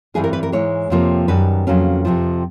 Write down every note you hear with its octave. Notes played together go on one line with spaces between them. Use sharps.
G2 E3 G3 C4 G#4
A#4
B4
A#4
G#2 E3 G#3 C#5
F2 C3 F3 A#3
F#2 D#3 G3 B4
F2 C#3 F#3 A#3 C#4
F2 C3 F3